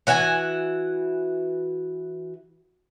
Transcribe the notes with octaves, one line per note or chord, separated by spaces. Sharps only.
E3 F#4 E5 G#5